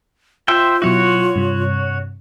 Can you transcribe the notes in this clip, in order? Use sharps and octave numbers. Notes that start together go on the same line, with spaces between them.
F4 C5 E5 G5
B2 F#3 E4 F#4 C#5
G2 C3